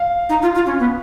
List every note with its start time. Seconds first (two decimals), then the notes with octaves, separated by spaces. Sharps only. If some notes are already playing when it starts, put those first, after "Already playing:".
Already playing: F5
0.29 D#4
0.42 F4
0.55 F4
0.66 C#4
0.79 B3